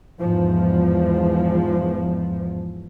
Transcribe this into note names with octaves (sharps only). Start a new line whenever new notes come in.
E2 G#2 F3